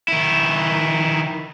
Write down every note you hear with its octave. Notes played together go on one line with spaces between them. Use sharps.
D#3 E4